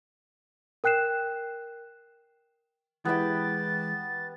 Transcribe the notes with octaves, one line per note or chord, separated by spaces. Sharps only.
A#4 G5 F#6 C7 E7
E3 G#3 B3 E4 G4 G5 A6